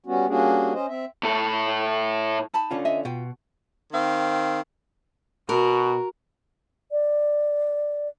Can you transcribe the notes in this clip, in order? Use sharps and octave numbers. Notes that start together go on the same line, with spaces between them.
G3 B3 C#4 F#4
G3 A#3 C#4 D4 F#4 G#4
C#4 C5 D#5
C4 E5
A2 A4
D#4 A5 B5
D3 C#4 F4
D#5 E5 G#5
B2 F4 G5
D#3 C4 F5
B2 F#4 A#4
D5